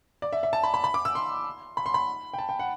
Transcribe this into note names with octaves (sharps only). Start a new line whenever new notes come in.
D5
E5
E5
A5
B5
B5
B5
D6
E6
C6
B5
C6
B5
G5
A5
G5
F#5